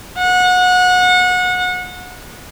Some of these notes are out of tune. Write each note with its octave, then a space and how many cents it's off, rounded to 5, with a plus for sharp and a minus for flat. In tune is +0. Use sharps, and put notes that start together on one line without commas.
F#5 -25